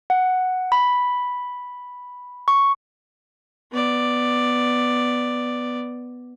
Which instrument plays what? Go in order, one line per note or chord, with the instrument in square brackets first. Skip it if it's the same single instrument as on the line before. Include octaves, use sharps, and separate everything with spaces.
[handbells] F#5
B5
C#6
[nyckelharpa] B3 D5